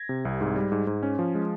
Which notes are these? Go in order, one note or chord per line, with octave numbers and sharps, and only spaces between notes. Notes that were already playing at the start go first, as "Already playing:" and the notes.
Already playing: G#6 A#6
C3
C2
G#2
G3
G#2
G#2
C#4
F3
G#3